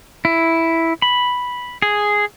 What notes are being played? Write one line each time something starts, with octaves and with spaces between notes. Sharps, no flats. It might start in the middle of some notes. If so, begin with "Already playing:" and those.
E4
B5
G#4